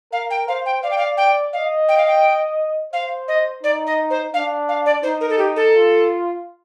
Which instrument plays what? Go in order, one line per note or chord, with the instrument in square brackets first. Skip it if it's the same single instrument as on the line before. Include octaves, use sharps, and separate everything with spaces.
[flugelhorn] A#4 [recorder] F5
[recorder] G5
[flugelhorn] C5 [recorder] F5
[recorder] G5
[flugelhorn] D5 [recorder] F5
[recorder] G5
F5
G5
[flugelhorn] D#5 [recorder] F5
[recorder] G5
F5
G5
[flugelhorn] C5 [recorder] F5
[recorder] D#5
[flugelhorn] D#4 [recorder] D5
[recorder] D#5
C5
[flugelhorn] D4 [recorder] F5
[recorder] F5
D5
[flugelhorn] D#4 [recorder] C5
[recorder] A#4
A4
G4
A4
[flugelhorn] F4